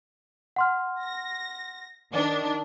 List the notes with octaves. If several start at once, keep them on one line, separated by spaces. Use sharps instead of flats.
F#5 C6 F6
A#6
D#3 D4